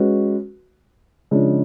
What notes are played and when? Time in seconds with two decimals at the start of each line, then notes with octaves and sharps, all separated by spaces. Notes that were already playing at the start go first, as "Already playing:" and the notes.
Already playing: G#3 C#4 F#4 B4
1.31 C#3 F3 G#3 D4